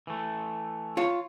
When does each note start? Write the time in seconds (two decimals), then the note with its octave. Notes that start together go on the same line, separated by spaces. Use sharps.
0.07 E3 A3
0.97 F4 C#5